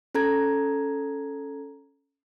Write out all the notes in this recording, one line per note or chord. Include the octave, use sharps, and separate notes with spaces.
C#4 A4 A#5 G#6